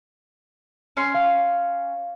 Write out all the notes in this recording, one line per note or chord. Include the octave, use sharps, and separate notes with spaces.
C#4 C6
F5